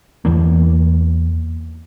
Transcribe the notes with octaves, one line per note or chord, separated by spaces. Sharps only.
E2 E3 A#3